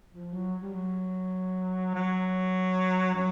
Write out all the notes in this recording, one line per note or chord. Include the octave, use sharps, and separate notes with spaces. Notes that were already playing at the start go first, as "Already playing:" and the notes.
F3
F#3
G3
F#3
F#3
F#3